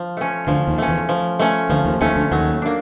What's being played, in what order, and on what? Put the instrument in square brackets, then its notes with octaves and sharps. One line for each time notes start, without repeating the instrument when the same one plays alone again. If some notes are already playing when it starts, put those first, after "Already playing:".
Already playing: [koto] F3
A3 C#4
[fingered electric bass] D2 D3 [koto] F3
[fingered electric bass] D#2 D#3
[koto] A3 C#4
[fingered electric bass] E2 E3
[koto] F3
A3 C#4
[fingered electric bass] D2 D3 [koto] F3
[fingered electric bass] D#2 D#3
[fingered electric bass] D#2 D#3 [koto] A3 C#4
[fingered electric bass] D2 D3
[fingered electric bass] D#2 D#3 [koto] F#3
[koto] A#3 D4